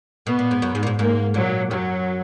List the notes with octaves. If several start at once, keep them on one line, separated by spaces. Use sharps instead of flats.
B2 B3
A#2
G#2
F#2
G#2
A#2
G#2
G#2 A#3
A#2 F#3
F#2 F#3